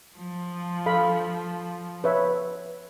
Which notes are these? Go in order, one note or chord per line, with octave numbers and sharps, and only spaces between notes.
F3
A4 F5 B5
B4 C#5 E5